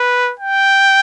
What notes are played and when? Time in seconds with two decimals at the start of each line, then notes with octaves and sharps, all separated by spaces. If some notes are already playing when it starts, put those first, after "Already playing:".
Already playing: B4
0.40 G5